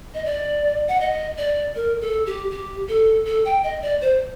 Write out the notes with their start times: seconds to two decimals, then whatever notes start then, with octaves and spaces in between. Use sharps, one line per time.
0.14 D#5
0.25 D5
0.89 F#5
1.00 D#5
1.38 D5
1.76 A#4
2.01 A4
2.26 G4
2.51 G4
2.88 A4
3.26 A4
3.45 G5
3.64 D#5
3.82 D5
4.01 C5